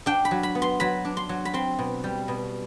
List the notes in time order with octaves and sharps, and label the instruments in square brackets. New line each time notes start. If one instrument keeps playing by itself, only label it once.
[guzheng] D4 G5
B5
F#3
B5
B3
C6
F#3 B5
D4
C6
F#3
B5
C4 C6
B2
G3
B2